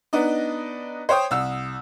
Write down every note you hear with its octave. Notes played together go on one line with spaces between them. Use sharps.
B3 D4 D#4 D#5
C5 C#5 G5 D#6
C2 E6